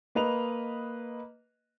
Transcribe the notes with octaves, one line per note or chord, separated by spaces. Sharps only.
A#3 B4 D#5 F7